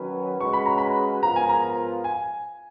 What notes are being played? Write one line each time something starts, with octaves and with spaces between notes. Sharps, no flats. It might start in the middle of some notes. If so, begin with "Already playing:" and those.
Already playing: D#3 F#3 C#4 F#4 B4
C#3 G#3 C#4 F#4 B4 C#6
B5
A#5
B5
G#2 F3 B3 F4 A#4 A#5
G#5
A#5
G#5